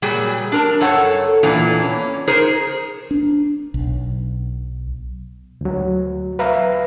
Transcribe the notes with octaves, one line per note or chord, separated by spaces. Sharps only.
A#2 F#3 G3 G#4
D4 A#4 A5
F#2 A4 C#5 F#5
E2 A#2 E3 D4
C#4
D#4 G#4 A#4 C5
D4
B1
D2 F#3
B4 E5 F5 A#5